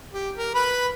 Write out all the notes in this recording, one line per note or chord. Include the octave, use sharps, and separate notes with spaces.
G4
A#4
B4 B5